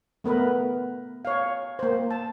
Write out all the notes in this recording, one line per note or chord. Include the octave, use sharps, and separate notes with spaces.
A3 B3 A#4 B4
C#5 F5
A#3 C5
A5